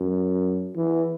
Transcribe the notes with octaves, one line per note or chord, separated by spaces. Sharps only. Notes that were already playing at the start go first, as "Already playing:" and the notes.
Already playing: F#2
E3